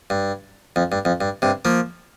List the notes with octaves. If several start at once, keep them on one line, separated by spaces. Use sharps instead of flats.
G2
F2
G2
F2
G2
G2 C3
F3 A#3